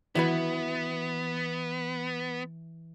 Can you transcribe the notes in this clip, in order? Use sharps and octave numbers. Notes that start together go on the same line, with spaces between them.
E3 B3 E4 F#4 B4